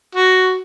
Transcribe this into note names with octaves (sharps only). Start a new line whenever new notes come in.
F#4